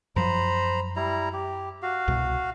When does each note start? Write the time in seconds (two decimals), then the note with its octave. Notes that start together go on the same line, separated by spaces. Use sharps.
0.16 F#2 F3 F#3 C5 A#5 B5
0.96 G3 E4 A#5
1.33 G4
1.82 F#4 F5
2.08 C2 B2